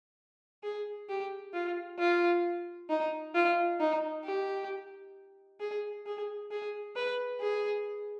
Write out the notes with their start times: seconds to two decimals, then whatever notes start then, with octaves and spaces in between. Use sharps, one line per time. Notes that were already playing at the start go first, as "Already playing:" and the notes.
0.63 G#4
1.09 G4
1.54 F4
1.99 F4
2.90 D#4
3.35 F4
3.80 D#4
4.25 G4
5.60 G#4
6.06 G#4
6.51 G#4
6.96 B4
7.41 G#4